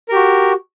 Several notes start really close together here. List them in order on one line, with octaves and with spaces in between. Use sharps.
A#4 G4 F#4